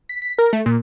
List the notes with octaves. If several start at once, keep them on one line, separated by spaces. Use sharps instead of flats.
B6
B6
A#4
A3
A#2